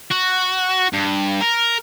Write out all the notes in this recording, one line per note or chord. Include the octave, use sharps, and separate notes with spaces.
F#4
G2
A#4